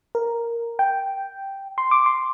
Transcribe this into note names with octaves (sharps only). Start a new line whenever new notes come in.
A#4
G5
C6
D6
C6